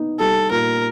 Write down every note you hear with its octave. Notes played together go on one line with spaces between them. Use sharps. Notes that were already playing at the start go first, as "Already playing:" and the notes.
Already playing: B3 D#4
G3 A4
A#2 A#4